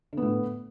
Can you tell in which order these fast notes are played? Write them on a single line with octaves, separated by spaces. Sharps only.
D3 B3 A2